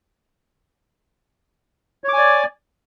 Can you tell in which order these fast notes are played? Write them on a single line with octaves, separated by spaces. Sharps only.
C#5 D6 G#5 D5